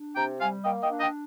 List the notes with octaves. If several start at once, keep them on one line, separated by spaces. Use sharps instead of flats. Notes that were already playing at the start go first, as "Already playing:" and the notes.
Already playing: D4
C3 G5 A#5
G3 F5 G#5
A#3 D#5 G5
D#5 G5
D4
D#5 G5